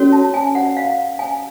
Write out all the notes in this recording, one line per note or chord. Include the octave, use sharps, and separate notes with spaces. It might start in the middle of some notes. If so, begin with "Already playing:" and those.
Already playing: C#4 F#4 A4 C#5
A5
G#5
F#5
F5
G#5